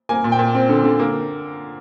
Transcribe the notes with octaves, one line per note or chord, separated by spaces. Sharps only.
A#3 G#5
A#2
G5
A#2
C4
D3
D3
A#3